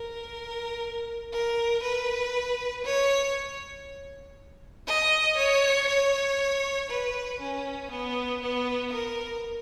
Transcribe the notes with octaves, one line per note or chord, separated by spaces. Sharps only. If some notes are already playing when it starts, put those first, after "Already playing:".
Already playing: A#4
A#4
B4
C#5
D#5
C#5
C#5
B4
C#4
B3
B3
A#4